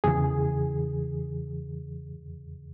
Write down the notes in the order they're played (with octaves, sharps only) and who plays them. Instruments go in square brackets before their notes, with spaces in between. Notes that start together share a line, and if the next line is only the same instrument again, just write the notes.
[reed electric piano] E2 C#3 E3 G#4